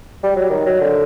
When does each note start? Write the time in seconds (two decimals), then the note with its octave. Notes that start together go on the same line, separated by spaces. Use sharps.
0.24 G3
0.36 F#3
0.50 D#3
0.66 F#3
0.81 D3